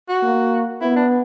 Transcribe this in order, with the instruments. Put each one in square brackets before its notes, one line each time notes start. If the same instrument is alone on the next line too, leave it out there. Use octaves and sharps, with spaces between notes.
[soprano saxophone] F#4
[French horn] A#3
[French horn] B3 [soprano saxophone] E4
[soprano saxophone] D4